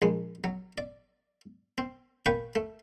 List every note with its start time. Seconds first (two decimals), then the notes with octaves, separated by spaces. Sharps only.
0.02 A#1 G#3
0.44 F#3
0.78 D5
1.78 C4
2.26 A#2 B4 G5 C#6
2.55 A3